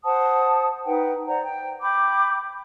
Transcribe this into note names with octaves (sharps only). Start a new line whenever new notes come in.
C5 F#5 A5 D#6
D#4 B4 F#5 G5
C5 D5 F#5 A#5
G5
G5 B5 D6 G6